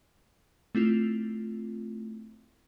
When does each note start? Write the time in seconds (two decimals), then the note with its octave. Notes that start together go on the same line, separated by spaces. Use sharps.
0.75 A3 C4 E4 F4